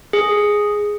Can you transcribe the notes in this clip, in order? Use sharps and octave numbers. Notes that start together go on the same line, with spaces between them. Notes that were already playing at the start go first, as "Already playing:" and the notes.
G#4